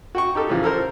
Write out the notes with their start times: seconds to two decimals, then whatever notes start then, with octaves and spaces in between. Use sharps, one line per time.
0.15 F#4 G5 C#6
0.35 D#4 G4 A4
0.49 A2 C#3 E3 F3
0.64 A4 A#4 C5